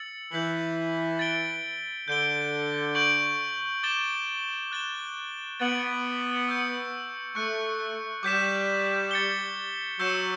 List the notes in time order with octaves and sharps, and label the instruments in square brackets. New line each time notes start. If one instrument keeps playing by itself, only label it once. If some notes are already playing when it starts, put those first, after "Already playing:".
Already playing: [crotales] E6 A6 C#7 F#7
[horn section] E3 [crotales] G6 B6 F#7
[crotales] A6 D7 G7
[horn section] D3 [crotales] G6 D7 G7
[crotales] C#6 G6 D7 F#7
D6 A6 E7 G7
F#6 A6 E7 G7
[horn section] B3 [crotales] A6 D7 F#7
[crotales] C#6 E6 G6 C#7
[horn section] A3 [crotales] C#6 F#6 C#7
[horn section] G3 [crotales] D6 G6 B6 E7
[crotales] A6 C#7 G7
[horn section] F#3 [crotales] C#6 E6 G6 C#7 E7